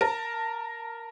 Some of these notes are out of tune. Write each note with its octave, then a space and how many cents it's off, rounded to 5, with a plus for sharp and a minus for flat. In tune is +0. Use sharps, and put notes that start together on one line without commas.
A#4 +0 A5 +25